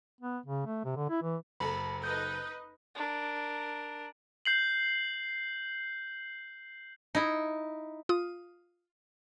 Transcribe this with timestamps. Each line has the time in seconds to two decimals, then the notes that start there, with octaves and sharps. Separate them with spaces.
0.21 B3
0.46 C#3
0.66 A3
0.85 C3
0.97 D3
1.10 E4
1.23 E3
1.60 F#1 A4 A#5 B5
2.04 D#4 B4 D#5 G6
2.95 D4 A#4
4.45 G6 C7 F#7
7.15 D#4 E4
8.09 F4 D#6